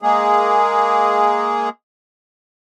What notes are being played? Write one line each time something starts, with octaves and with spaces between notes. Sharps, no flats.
G#3 A#3 G#4